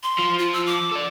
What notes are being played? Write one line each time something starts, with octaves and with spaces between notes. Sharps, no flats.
C6
F3
F4
E6
D6
A4 D5